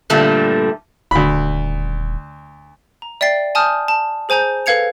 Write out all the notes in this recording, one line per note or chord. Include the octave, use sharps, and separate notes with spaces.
G2 A#2 D3 G3 A3
D#1 D2 B5
A#5
D5 E5 G5 A6 C7
G#5 A5 D#6 F6 G6
A5
G#4 C5 G#5 A#5 G6
A4 B4 F5 G#6 C#7 F7